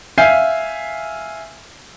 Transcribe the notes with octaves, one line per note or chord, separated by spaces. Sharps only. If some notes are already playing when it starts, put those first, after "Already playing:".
E5 F5 G#5 G6 C7